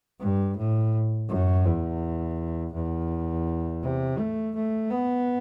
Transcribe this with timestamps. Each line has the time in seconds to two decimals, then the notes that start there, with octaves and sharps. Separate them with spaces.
0.20 G2
0.57 A2
1.29 F#2
1.66 E2
2.74 E2
3.82 C3
4.18 A3
4.55 A3
4.91 B3